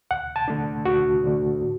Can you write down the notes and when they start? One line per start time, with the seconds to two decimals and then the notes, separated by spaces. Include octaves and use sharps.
0.11 D2 F#5
0.36 A5
0.48 D3 A3 D4
0.85 D2 F#4
1.24 D3 A3 D4
1.61 A2